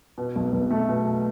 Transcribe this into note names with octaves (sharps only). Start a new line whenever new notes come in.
B2
B1
B1
A3
B2